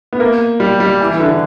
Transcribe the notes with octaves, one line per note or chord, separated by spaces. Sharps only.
B3
A#3
G3
G3
E3
E3
D3
D3